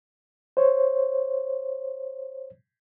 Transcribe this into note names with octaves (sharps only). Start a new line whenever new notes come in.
C5 C#5